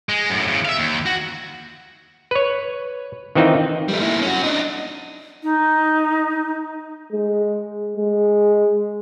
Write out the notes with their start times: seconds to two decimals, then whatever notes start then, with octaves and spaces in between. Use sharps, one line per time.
0.09 G#3
0.30 F#2 A2
0.47 E2 C#3
0.65 E5 F5
0.77 D#2
1.06 F#4
2.31 B4 C#5
3.35 D#3 E3 C4 D#4 F4
3.88 G3 A3
4.00 A#3 E4
4.22 C#4 F#4
4.43 D4 D#4
5.43 D#4
7.12 G#3
7.97 G#3